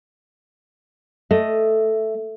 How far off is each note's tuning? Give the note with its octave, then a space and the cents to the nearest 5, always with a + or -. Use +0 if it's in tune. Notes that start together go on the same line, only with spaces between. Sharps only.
A3 +0 D#5 +0